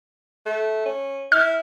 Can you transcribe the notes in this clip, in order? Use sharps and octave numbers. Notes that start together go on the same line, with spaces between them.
A3
C#4
E4 F6